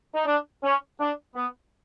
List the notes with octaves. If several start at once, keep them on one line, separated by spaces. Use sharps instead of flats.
D#4
D4
C#4
D4
B3